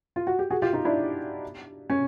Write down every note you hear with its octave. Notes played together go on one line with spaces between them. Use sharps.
F4
F#4
G4
F#4 G#4
F4 G4
D#4 F4
D4 E4
C#4